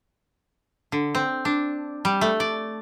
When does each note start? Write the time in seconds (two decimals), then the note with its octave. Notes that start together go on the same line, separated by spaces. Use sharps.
0.92 D3
1.15 C4
1.45 D4
2.05 G3
2.21 A3
2.40 D5